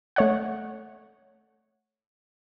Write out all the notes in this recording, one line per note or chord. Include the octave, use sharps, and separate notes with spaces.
A3 C#5 F#5